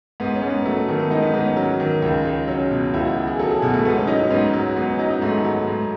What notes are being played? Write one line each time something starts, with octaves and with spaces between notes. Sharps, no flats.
G#2 B3
C#4
G#2
B3
F#3 A3
A3
D#3 A3
B3
G#2 D#4
B3
G#2 B3
C#4
F#3
D#3
C#2
C#2
F#3 C#4
B2
C#2 E4
F#4
C#2 F#4
G#4
F#3 A4
G#4
B2 F#4
A3
G#2 B3
C#4
F#3 D#4
C#4
G#2 B3
F#3
G#2 B3
C#4
F#3 D#4
D#4
G#2 A3
F#3
G#2